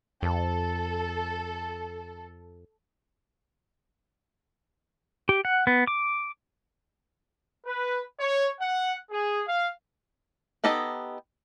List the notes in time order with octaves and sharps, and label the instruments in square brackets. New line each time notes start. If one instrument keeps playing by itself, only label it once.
[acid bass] F2 [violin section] A4
[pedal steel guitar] G4
F#5
B3
D6
[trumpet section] B4
C#5
F#5
G#4
F5
[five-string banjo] B3 D#4 G4 A4 D#5